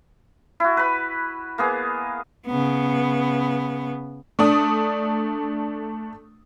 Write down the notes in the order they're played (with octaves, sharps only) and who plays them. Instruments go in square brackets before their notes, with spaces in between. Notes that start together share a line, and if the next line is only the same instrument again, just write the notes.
[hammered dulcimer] E4 F#4
B4 B5
A#3 B3 G#4
[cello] C#3 B3
[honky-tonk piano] A3 D4 D#6